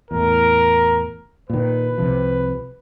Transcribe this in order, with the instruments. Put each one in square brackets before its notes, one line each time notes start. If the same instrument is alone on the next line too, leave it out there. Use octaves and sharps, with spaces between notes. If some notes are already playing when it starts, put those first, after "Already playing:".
[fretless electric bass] E2 A2 [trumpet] A#4
[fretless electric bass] A#2 D#3 [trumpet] B4
[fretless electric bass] C2 C3 F3